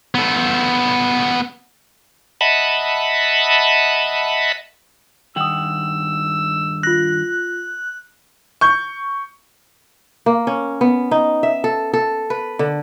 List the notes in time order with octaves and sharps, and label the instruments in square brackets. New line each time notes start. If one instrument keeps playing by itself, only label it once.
[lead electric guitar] B3 A4
[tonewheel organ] D#5 E5 F#5 A5 B5
[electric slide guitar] G2 D#3 F#5 [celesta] G5 D#6 [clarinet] E6
[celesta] F4 A#6 [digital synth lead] F#6
[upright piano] C#6 G6
[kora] A#3
C#4
B3
D#4
E5
A4
A4
B4
D3